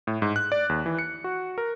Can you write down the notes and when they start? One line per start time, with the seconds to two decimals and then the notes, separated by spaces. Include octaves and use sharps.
0.07 A2
0.22 G#2
0.36 F#6
0.52 D5
0.69 D#2
0.86 E3
0.99 C#7
1.24 F#4
1.58 A#4